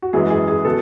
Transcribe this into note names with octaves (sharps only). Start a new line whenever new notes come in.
F#4
F#2 E3 G#3 G#4
G#4
G#4
B2 A4